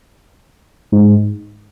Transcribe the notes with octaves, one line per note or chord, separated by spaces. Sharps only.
G#2